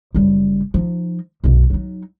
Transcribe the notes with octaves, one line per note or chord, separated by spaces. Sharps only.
F#1 G3
F3 D#4
B1 F#2
F#3 D#4